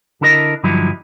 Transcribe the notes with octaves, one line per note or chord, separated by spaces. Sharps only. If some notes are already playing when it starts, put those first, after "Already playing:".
D3 D4 E4 A#4 D#5
G2 D3 F3 F#3 D#4 E4